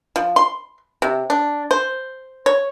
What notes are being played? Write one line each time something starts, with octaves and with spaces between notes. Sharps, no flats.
F3
C6
C3
D4
C5
C#5